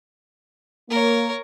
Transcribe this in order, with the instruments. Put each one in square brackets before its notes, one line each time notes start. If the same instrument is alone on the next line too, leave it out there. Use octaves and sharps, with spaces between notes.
[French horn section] A#3 [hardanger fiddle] A#4 C#5